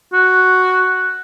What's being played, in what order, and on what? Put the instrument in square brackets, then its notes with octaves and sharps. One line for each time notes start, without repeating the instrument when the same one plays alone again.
[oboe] F#4